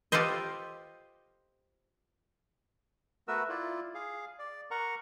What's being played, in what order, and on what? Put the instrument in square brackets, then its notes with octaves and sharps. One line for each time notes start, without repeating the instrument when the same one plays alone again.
[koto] F4 G4 A4 B4 C5 D#5
[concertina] A3 B3 F#4 A#4 B4 E6
E4 F4 D5
G#4 F5
D5
A#4 F#5 A#5 C#6